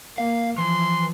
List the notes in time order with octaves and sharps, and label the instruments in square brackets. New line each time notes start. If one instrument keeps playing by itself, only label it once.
[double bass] A#3 [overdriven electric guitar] F5
[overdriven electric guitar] E3 [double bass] F3 [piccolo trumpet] C6